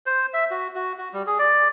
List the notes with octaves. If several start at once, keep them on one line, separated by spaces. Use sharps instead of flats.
C5
E5
F#4
F#4
F#4
G3
G#4
D5